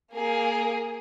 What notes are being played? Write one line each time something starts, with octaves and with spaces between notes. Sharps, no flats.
A#3 G#4